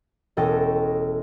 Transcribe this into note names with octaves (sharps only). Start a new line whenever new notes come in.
E1 C#4 A4 D#5 G5 A#6